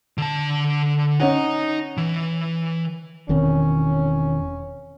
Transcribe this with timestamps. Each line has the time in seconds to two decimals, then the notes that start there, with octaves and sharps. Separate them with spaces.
0.18 D3 A5
1.20 C#4 D#4 C#5 D#5 F#5
1.98 E3
3.29 E1 D#3 C4 C#4